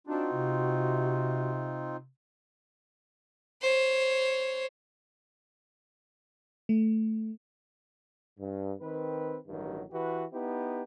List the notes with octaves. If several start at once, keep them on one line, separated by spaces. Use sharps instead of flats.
C4 D4 D#4 F4 F#4
C3
C5 C#5
A3
G2
D#3 C4 B4
A1 G2 D#3 F#3
E3 F#4 G4 B4
B3 D#4 E4 G4